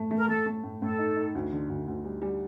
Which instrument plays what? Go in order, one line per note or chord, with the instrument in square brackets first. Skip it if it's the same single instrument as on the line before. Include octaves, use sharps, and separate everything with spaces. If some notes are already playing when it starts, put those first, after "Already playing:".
Already playing: [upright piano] A2 A3
A3
[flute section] A#4
[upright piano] A3 [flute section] A4
[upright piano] A3
A2
[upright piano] A2 [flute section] A4
[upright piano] D#4
D#4
D2
D3
D2
D2
G3
G3